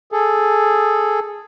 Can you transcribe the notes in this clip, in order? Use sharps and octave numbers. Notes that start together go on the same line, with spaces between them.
G#4 A4